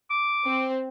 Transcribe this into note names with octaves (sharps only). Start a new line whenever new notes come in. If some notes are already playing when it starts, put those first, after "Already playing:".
D6
C4